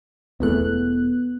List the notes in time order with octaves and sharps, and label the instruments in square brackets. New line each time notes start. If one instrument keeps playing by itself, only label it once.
[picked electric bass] E1 E2 A3 [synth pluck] B3 F#6